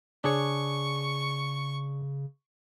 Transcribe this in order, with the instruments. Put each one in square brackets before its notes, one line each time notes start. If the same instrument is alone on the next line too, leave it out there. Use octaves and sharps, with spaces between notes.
[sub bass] C#3 [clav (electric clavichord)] D4 G#4 C#5 [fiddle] C#6